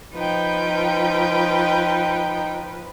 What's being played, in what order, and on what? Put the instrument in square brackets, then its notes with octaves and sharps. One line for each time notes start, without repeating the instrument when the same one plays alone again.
[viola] F3 B4 [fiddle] D#4 G5